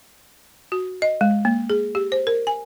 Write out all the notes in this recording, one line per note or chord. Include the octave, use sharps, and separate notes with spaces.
F#4
D#5
G#3
A#3
G#4
G4
C5
A#4
G#5